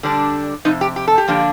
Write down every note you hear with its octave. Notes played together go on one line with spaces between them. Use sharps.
D3 G3 D4
F2 C3 D#4
G4
G4
A4
G4
D3 F3 A#3 D4